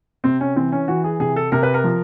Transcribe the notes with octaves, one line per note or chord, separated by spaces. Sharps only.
C3 C4
C#4
E3 C4
C#4
E3 F#4
G#4
C3 G#4
A4
C3 A#4
B4
A#4
F3